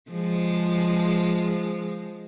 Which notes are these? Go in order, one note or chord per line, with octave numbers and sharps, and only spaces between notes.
F3 G#3